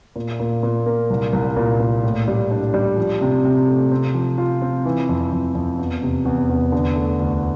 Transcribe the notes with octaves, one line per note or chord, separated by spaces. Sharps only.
A#2
A#2
A#2
A#3
C2
C2
A#2
A#2
A2
G3
D4
G3
F3
C3
C3
A3
C4
F3
F4
C4
E3
F2
F2
F2
E2
C3
E2
E2
D3
A3
D2